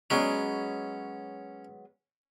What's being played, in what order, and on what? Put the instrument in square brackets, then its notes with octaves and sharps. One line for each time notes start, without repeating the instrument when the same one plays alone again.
[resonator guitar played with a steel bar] F#3 G#3 B3 [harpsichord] C#4